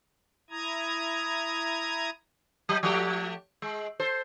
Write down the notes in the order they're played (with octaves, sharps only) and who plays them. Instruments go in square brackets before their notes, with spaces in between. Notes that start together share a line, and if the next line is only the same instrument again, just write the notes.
[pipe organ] E4 A#5 D#6 G#6
[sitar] F#3
F3 A3 G4
G#3
A4 C5